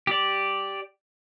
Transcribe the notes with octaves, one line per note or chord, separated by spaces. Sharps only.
G4 D5